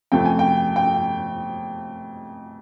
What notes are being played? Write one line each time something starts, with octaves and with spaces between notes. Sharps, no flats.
F2 C3 F3 A3 G5
G#5
G5
G5